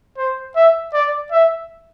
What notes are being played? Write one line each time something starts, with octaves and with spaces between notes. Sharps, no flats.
C5
E5
D5
E5